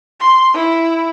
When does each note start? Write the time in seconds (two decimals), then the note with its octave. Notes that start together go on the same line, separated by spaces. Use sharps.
0.20 C6
0.54 E4